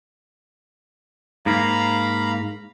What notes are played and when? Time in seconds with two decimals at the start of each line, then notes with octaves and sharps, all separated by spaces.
1.46 G#2 A#3 F5 A#5 B5